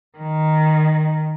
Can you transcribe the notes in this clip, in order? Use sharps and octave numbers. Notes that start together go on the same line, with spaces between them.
D#3